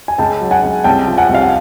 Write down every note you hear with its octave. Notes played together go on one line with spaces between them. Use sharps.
G#5
C#2 G5 A5
F#3
F#5 G#5
C#2
C2 G5 A5
F3
F#5 G#5
C2
F5
F#5